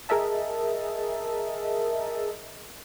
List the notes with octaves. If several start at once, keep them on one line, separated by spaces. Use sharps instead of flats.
G#4 A#4 D#5 E5 A5